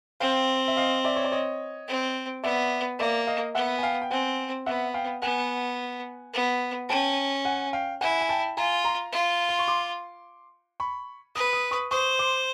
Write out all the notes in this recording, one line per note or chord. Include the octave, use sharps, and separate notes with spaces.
C4 F5 G5
E5
D#5 F5
D5 E5
C#5
D5
C#5 D#5
C4
B3 D5 E5
A#3 D5 E5
D#5 F5
B3 E5 F#5
G#5
F5 G5
G5
C4 F#5 G#5
B3 E5 F#5
F5 G5
B3 F#5 G#5
B3
C#4 G5 A5
F#5 G#5
F5 G5
E4 F#5 G#5
G#5
G5 A5
F4 G#5 A#5
A#5 C6
F4
C6
C#6
C6 D6
B5 C#6
B4 D#6
D#6
C#6 D#6
C5 C#6 D#6
C6 D6